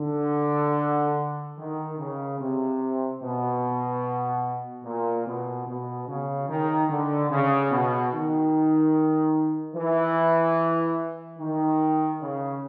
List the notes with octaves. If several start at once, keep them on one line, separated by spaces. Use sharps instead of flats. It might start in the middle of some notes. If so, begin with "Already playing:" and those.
Already playing: D3
D#3
C#3
C3
B2
A#2
B2
B2
C#3
D#3
D3
C#3
B2
D#3
E3
D#3
C#3